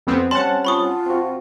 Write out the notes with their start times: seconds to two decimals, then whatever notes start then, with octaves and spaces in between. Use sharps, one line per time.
0.07 F2 B3 C4
0.31 G3 C4 C#4 F#5 A5 C6
0.65 F4 B5 C#6 D#6
1.06 C4 F#4